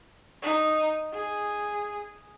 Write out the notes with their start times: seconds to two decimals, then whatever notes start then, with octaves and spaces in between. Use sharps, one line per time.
0.42 D#4
1.13 G#4